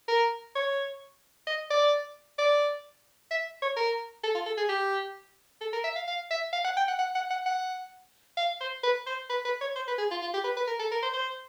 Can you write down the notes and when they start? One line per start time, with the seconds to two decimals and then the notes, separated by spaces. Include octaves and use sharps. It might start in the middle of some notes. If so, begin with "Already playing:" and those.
0.08 A#4
0.55 C#5
1.47 D#5
1.71 D5
2.39 D5
3.31 E5
3.62 C#5
3.77 A#4
4.24 A4
4.35 F4
4.46 A4
4.58 G#4
4.69 G4
5.61 A4
5.73 A#4
5.84 E5
5.96 F5
6.08 F5
6.31 E5
6.53 F5
6.64 F#5
6.77 G5
6.88 F#5
6.99 F#5
7.15 F#5
7.31 F#5
7.46 F#5
8.37 F5
8.61 C5
8.84 B4
9.07 C5
9.30 B4
9.45 B4
9.61 C#5
9.76 C5
9.88 B4
9.98 G#4
10.11 F4
10.22 F4
10.34 G4
10.44 B4
10.57 B4
10.68 A#4
10.79 A4
10.92 A#4
11.03 C5
11.14 C5